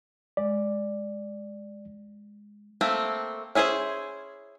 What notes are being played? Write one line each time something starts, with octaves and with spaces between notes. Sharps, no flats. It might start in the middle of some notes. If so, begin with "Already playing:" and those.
G#3 D5
A3 A#3 C4
C#4 E4 G#4 A#4 C5